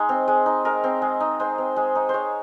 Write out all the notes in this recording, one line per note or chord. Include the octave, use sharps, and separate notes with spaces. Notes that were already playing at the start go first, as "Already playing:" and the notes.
Already playing: G#3 D#4
C4
G#3
D#4
G#3 A#4
C4
G#3
D#4
G#3 C5
C4
G#3
D#4
G#3 C5 C#5